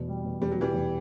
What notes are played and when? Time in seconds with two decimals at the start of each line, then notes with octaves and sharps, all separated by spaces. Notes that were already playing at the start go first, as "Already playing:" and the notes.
Already playing: E2 B2
0.09 G3
0.25 E2
0.42 E2 G3
0.51 F#3
0.58 B2 E3 G3
0.74 E2